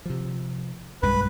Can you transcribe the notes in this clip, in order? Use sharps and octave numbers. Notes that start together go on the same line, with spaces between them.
C3 F3
B1 G2 G#3 B4